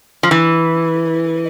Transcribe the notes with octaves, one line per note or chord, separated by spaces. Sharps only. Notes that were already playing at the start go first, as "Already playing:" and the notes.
F3
E3